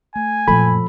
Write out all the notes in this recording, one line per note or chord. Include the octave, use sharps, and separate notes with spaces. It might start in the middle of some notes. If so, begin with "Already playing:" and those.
A3 G#5
F#2 A#2 F3 A4 B5